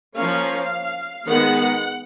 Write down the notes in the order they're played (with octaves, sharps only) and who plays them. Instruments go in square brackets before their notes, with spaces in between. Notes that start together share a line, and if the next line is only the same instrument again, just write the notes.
[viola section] F3 A#3 C#4 F5
D#3 G#3 B3 F#5